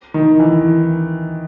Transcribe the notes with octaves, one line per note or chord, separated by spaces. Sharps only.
D#3
E3